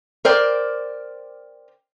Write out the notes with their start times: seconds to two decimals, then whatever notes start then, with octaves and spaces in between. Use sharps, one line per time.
0.25 A#4 C5 D5 G5